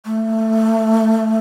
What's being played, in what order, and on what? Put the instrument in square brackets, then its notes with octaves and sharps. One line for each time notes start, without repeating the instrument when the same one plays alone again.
[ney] A3